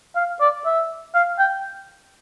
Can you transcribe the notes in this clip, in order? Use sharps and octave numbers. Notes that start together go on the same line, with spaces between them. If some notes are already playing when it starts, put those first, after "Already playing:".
F5
D5
E5
F5
G5